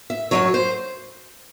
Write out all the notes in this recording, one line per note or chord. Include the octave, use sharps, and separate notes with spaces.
E5
F#2 D#3 F#3 C#5
C5